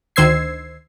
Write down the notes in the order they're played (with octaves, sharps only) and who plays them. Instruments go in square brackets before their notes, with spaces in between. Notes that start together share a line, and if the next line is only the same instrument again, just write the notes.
[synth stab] D2 D#3 C5 E6 G#6 C7